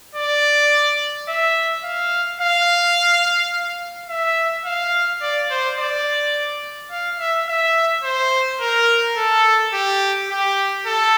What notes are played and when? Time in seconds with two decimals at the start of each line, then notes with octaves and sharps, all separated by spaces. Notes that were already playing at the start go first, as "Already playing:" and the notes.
0.15 D5
1.28 E5
1.84 F5
2.40 F5
4.09 E5
4.65 F5
5.22 D5
5.50 C5
5.78 D5
6.91 F5
7.19 E5
7.48 E5
8.04 C5
8.60 A#4
9.17 A4
9.73 G4
10.30 G4
10.86 A4